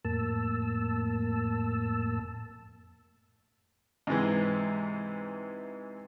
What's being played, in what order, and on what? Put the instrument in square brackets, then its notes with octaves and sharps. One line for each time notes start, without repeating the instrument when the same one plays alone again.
[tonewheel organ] F2 A2 A#3 A5 E6
[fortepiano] G#2 C3 E3 G#3